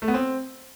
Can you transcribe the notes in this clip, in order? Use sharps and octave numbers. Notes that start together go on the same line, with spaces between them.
A3
B3
C4